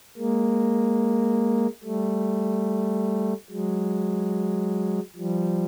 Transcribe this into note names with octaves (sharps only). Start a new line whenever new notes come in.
G#3 A#3
G3 A3
F#3 G#3
F3 G3